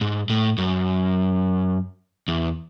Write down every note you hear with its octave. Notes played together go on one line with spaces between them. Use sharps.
G#2
A2
F#2
E2